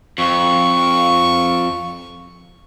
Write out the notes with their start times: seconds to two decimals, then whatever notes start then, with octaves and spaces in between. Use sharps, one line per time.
0.18 F2 C#6